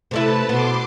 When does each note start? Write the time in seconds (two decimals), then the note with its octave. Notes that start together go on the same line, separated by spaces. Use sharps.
0.11 C3 A3 E4 B4 A5
0.49 B2 B3 C6 D6